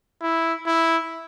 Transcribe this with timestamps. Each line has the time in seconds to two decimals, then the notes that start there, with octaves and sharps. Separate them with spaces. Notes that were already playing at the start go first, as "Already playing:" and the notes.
0.22 E4
0.66 E4